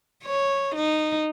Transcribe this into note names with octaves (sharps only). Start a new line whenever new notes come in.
C#5
D#4